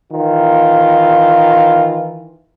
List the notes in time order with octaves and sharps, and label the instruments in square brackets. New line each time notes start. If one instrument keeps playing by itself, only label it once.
[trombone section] D#3 E3 F4